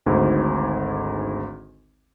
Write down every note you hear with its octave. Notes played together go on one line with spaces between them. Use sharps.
G#1 D2 G#2